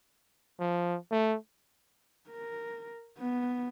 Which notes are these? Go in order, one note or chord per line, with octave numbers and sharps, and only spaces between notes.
F3
A3
A#4
B3